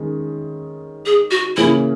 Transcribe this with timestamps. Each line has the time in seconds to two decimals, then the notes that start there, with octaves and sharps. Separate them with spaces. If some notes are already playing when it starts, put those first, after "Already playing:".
Already playing: D#3 G#3 C#4
1.06 G#4
1.31 F#4
1.57 C#3 E3 A#3 C#4 E4 G#4